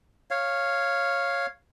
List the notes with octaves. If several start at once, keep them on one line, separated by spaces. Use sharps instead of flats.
C#5 F5